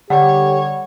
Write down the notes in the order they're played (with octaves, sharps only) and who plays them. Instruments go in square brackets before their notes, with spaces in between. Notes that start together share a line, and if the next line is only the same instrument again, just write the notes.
[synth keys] D3 G3 [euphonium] G4 [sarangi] C#5 [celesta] F#5